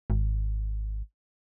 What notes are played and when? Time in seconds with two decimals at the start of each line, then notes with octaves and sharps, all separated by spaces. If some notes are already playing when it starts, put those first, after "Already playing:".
0.10 G#1